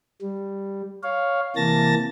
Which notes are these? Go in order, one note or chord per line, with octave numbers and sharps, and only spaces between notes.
G3
C#5 F5
C3 E3 A#3 A5 A6 A#6